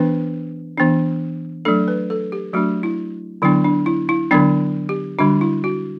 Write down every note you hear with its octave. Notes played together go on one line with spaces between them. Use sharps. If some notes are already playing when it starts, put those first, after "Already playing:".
Already playing: E3 B3 D4 B4
E3 B3 D4
F#3 A3 D4 A4
B4
A4
G4
F#3 A3 D4 F#4
E4
D3 F#3 B3 D4 E4
D4
E4
E4
D3 F#3 B3 D4
G4
D3 G3 D4 F#4
E4
F#4